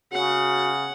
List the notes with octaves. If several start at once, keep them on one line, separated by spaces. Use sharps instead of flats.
C#3 F#4 F#5